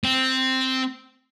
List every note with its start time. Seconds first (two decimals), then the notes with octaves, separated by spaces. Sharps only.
0.04 C4